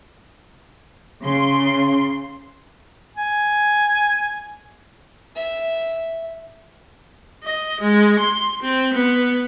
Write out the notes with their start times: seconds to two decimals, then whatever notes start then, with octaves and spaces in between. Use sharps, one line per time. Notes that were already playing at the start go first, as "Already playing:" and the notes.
1.23 C#3 C6
3.17 G#5
5.36 E5
7.43 D#5
7.80 G#3
8.20 C6
8.62 C4
8.93 B3